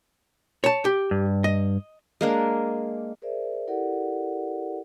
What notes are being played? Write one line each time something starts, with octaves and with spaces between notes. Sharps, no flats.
C#5 A5
G4
G2
D#5
G#3 A#3 D4
G#4 A#4 C5 D5 E5
E4 G4 A4 A#4 D5 F#5